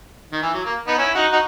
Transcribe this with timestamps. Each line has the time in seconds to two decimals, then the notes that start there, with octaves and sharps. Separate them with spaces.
0.32 D#3
0.42 E3
0.54 F#3
0.64 A#3
0.87 B3 D#4
0.98 C#4 E4
1.15 D#4 F#4
1.32 D#4 F#4